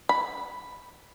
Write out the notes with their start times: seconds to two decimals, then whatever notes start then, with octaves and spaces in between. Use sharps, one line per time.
0.09 B5